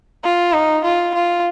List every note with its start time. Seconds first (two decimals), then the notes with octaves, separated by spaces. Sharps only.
0.24 F4
0.53 D#4
0.84 F4
1.14 F4